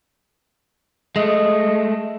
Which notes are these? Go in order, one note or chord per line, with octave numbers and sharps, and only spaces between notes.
G#3 A3 D#5